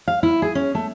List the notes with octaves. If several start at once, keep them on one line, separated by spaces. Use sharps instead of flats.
F5
E4
G#4
C#4
A3